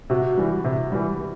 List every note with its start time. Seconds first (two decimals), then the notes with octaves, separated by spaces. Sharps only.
0.10 C3 F#4
0.37 E3 G3
0.64 C3
0.92 E3 G3